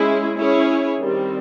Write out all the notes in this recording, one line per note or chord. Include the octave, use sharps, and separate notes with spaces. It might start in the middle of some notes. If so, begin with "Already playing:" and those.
Already playing: G#3 C#4 E4 G#4
C#4 E4 G#4 C#5
D#3 G3 C4